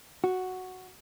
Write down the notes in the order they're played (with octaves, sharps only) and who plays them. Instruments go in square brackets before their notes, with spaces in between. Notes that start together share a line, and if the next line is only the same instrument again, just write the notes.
[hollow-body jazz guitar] F#4